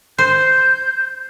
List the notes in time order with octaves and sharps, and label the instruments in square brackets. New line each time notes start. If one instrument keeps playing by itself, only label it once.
[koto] C5 [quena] G6